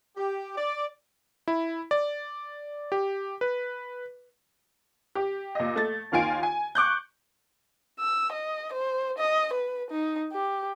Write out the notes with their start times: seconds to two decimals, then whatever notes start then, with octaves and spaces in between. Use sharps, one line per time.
0.17 G4
0.56 D5
1.48 E4
1.91 D5
2.92 G4
3.41 B4
5.15 G4
5.55 A#2 D#5
5.76 A3 A6
6.12 D#2 D#3 F4 G#5 D7
6.43 G#5
6.75 C#6 D6 F#6 G6
8.00 E6
8.33 D#5
8.73 C5
9.18 D#5
9.53 B4
9.91 D#4
10.33 G4